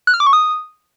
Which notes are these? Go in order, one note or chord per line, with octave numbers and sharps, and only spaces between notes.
F#6
F6
D6
C#6
D#6